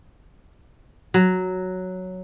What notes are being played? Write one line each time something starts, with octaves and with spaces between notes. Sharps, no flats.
F#3